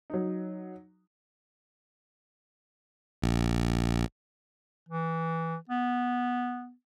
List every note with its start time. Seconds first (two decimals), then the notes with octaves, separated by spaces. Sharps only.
0.10 F#3 D#4
3.22 A#1
4.89 E3
5.69 B3